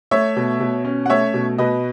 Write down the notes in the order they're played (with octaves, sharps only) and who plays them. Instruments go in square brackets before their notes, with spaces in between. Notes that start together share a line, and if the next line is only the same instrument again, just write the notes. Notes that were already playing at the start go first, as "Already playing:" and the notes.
[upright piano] A3 C#5 E5
B2
B2
C#4
F#5
A3 C#5 E5
B2
B2 B4 D#5